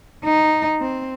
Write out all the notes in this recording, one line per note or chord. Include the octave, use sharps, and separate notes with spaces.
D#4
C4